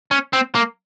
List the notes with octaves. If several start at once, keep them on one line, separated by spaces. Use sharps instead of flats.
C#4
C4
A#3